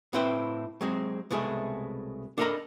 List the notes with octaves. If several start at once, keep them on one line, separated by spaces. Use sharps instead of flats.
A2 C4 E4 B4 C5 G5
F#3 G#3 C4
C2 B2 G#3 A3 G#4
D4 A4 A#4 D#5 A#5 B5